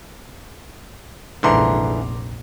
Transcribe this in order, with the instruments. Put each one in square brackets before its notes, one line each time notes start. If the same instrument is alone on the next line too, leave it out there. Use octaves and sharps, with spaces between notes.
[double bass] F1 A#1 [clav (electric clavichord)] G#2 D3 E3 [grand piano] A#5 C6 D6